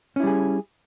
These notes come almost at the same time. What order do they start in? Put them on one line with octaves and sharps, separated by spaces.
C#4 E4 G3 G#4